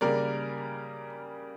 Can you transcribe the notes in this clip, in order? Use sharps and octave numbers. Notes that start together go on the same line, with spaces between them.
C#3 G3 A#3 A#4 D5